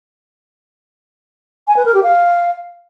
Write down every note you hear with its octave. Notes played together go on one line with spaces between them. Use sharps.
G#5
B4
A#4
G4
F5